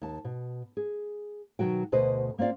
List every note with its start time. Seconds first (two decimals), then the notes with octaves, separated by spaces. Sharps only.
0.02 D#2 A5
0.24 B2
0.77 G#4
1.59 B2 D#3 F#3 F#4 G5
1.92 D2 B2 B4 C5 D#5
2.38 A#3 C4 F4 D5 F5